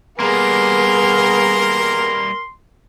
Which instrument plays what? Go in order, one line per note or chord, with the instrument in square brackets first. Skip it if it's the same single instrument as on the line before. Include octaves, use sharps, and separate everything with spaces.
[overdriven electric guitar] G3 A#3 [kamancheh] B3 G#4 [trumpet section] A#4 [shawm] C6